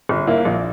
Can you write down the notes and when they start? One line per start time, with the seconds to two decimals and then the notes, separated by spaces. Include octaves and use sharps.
0.09 G1
0.27 A#3 E4
0.45 A#1